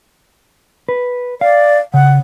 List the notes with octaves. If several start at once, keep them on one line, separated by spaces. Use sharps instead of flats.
B4
D5 F5
C#3 F#5